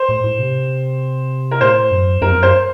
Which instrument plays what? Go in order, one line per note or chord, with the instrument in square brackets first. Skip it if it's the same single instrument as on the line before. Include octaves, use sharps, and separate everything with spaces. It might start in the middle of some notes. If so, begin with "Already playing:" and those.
Already playing: [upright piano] C5
[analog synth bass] A2
A2
C3
[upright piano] A#4
[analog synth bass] A2 [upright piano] C5
[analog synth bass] F#2
[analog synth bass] F#2 [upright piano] A#4
[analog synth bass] F2
F#2
[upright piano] C5